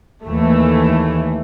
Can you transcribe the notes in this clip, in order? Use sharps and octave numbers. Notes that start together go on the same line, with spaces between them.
D#2 E3 A3